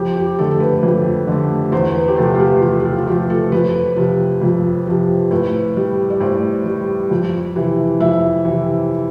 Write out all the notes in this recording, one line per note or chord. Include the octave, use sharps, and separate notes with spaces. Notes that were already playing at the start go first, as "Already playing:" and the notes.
Already playing: F2 G4
G4
D3 A3 A4
A4
B4
F2
D3 A3
E2 C5
B4
G4
C3 F3 A3 A4
F4
G4
E2 G4
G4
F4
F4
C3 F3 A3 G4
A4
F2 B4
C3 F3
F2
C3 F3
A2 B4
G3
D5
A2 C5
G3
F2
C3 E3
F2 E5
C3 E3